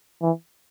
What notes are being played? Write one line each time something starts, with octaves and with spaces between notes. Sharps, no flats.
E3